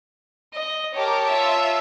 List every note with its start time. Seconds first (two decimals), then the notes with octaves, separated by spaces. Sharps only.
0.54 D#5
0.95 G4 A#4 C#5 A5 D6
1.26 F4 E5